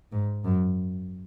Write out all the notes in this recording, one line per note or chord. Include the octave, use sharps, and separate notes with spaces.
G#2
F#2